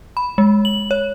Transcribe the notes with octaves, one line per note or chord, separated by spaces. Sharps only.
B5
G#3
F#7
C#5